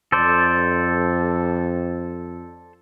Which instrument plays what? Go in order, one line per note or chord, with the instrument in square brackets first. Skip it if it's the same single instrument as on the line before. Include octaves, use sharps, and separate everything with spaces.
[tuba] F2 [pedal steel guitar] A4 C5 D5